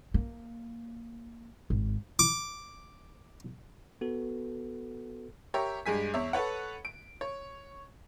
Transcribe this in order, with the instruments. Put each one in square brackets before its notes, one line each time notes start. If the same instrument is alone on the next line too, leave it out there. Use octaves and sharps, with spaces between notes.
[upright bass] A#3
G#1
[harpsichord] D6
[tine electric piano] B3 F#4 A4 B4
[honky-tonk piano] G4 A#4 C#5 E5
G2 G#3 G#5 B6
E2 C#5 E5
A4 B4 C#5 F#5
D7
C#5